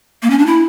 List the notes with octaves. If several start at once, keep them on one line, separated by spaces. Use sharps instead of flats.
A#3
C#4
D4
E4